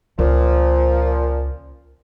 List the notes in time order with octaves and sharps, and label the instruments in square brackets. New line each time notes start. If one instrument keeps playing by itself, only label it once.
[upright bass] C#2 [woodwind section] A#2 F3